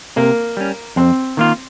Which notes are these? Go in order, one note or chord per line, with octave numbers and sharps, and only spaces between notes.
C3 A#3
G3 C#4
F2 C4
D#3 A#3 F4